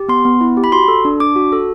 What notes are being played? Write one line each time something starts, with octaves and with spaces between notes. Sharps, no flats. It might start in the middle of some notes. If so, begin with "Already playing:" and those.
Already playing: G4
B3 C6
B3
E4
G4
B5
F#4 C6
A4
D4
D4 D6
F#4
A4